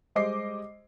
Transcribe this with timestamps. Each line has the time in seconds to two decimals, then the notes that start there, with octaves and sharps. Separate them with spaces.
0.15 G3 G#3 C5 D#5 D6 C7